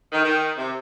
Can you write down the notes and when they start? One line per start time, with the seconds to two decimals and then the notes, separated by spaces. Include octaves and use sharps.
0.13 D#3
0.24 D#3
0.58 C3